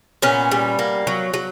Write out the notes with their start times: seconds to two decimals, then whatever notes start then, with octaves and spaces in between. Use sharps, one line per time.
0.22 A#2 B3 C#4
0.51 G3
0.79 A#3
1.07 F#3
1.34 F#3